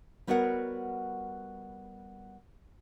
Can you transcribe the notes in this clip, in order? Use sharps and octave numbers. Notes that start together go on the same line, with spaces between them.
G3 B3 F#4 A#4 C#5 F#5